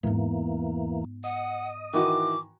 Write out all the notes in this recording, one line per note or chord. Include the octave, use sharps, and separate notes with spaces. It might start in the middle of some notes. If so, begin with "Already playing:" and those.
E2 G#2 E3 A#3 B3
D#5 F#5
D#3 E3 F#4 D6